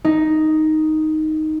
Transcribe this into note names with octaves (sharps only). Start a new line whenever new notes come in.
D#4